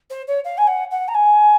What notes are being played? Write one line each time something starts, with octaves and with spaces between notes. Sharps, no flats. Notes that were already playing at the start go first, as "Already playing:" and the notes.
C5
C#5
F5
G#5
F#5
F#5
A#5
G#5